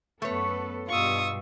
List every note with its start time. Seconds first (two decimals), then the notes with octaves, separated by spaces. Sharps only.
0.22 F#2 A3 B3 A4 B4 C#5
0.89 G2 B2 G3 F4 C#6 D#6 E6